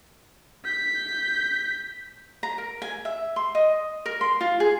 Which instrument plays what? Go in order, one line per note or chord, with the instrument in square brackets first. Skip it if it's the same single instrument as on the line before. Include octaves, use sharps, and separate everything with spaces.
[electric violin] G6 B6
[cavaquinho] A#5
A#4
G#5
E5
C6
D#5
A#4
C6
F4
G#4